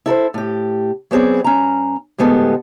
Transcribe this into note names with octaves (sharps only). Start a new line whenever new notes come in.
E4 A4 A#4 C5
A2 G4
F#3 B3 C4 G#4 D5
G2 C#4 A#5
D2 A2 G#3 B3 G4 A4